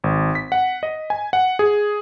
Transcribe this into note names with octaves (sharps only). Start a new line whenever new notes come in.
G#1
B6
F#5
D#5
G#5
F#5
G#4